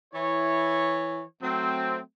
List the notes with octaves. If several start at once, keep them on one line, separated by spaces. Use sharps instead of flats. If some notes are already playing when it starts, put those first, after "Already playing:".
E3 E4 C#5
F#3 A3 C4